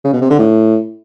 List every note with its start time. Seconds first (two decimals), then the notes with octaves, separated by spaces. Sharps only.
0.04 C#3
0.13 B2
0.21 C3
0.30 D3
0.39 A2